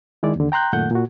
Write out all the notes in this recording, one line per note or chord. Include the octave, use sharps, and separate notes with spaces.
D#3 G#3 E4 D5
D#2 D3
G5 A#5 C6 F#6 G6
F#2 A#2 D#3 A3 F#5 G6
A#2 F#4